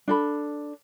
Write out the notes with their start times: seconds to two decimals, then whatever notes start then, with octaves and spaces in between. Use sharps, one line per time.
0.08 D4 A4 B5